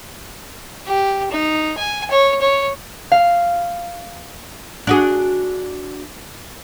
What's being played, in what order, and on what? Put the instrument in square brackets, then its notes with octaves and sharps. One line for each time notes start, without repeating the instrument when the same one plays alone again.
[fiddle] G4
D#4
G#5
C#5
C#5
[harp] F5
[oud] D4 F#4 G#4